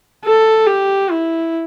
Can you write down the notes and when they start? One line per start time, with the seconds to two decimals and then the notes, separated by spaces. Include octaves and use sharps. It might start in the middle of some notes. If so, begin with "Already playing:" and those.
0.25 A4
0.67 G4
1.11 E4